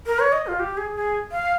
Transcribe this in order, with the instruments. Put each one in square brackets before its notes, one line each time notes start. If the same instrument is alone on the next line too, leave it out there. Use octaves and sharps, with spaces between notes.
[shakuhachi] A#4
C#5
D#5
F4
G4
G#4
G#4
F5